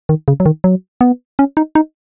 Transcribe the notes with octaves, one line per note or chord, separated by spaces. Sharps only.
D#3
C#3
F#3
D#3
F#3
B3
C#4
D#4
D#4